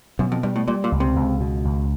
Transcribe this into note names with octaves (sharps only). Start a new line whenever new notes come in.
F#2 B2
F2
G2 G3
A2
A#2 G3
A#2
C#2
C3
C#2
B2
C#2